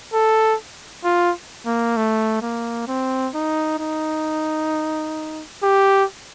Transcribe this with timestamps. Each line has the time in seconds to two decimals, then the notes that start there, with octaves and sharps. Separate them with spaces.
0.13 A4
1.04 F4
1.65 A#3
1.96 A3
2.42 A#3
2.88 C4
3.34 D#4
3.79 D#4
5.63 G4